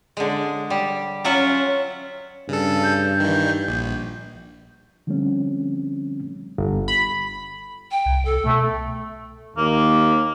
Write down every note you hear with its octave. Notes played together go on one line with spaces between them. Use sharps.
D3 G#3
G3
F#3 C#4 F4 E5 F#5
G2 C#3 A4
G6
D#3 E3
A#1
D3 F3 G3 A3 C4 C#4
G1
B5
G5
C2
A4
B2 A3
D#2 A#3